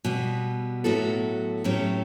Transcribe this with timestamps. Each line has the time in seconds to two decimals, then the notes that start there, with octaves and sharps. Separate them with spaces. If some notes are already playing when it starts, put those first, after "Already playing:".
0.05 B2 G3 B3
0.84 A2 F#3 B3 F#4 A4
1.64 A2 F#3 C#4 E4 G4